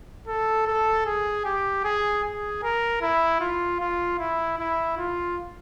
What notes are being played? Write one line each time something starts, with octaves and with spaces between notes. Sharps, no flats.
A4
A4
G#4
G4
G#4
G#4
A#4
E4
F4
F4
E4
E4
F4